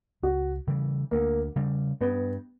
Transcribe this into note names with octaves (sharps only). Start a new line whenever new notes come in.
C#2 F#4
C#3 E3 G3
D2 A#3
C#3 G3
G2 B3